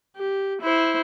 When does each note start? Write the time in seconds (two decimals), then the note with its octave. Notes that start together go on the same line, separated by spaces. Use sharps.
0.17 G4
0.62 E4 C5